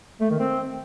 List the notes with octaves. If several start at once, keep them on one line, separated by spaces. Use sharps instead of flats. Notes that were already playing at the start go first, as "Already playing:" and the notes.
A3
D#3
C4